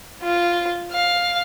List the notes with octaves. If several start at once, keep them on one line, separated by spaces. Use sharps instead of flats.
F4
F5